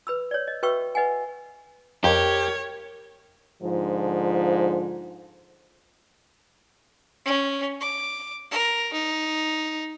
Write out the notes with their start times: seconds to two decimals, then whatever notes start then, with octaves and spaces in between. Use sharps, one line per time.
0.07 B4 B5 E6
0.31 C#5 D5
0.48 D#5
0.63 F#4 B4 E5 G5 C#6 E6
0.95 B4 D#5 F#5 G#5
2.04 F2 G4 A#4 C#5
3.63 G#2 D3 F3
7.25 C#4
7.81 D6
8.51 A#4
8.93 D#4